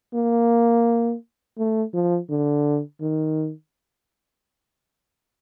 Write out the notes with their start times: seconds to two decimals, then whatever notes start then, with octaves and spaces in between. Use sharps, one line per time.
0.14 A#3
1.58 A3
1.94 F3
2.30 D3
3.01 D#3